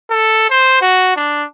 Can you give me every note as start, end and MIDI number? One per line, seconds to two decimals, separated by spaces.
0.10 0.49 69
0.50 0.78 72
0.81 1.12 66
1.16 1.45 62